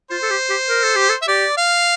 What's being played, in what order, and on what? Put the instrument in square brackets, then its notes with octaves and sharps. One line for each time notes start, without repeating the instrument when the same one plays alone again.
[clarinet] F4 [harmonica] C5
[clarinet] A4
G4
G4
A#4
A4
G4
A4
[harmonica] E5
[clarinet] G4 [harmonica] D5
[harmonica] F5